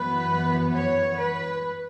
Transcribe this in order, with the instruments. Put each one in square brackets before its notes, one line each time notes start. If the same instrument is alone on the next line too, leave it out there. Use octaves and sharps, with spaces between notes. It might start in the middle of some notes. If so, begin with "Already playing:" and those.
Already playing: [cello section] F#2 E3 B3 B4
C#5
B4